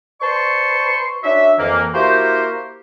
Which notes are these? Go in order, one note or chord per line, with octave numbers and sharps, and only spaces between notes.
B4 C5 D5 A5 C6 C#6
C#4 D4 F#4 E5
F2 E3 A#3
A#3 E4 F#4 G4 A#4 C5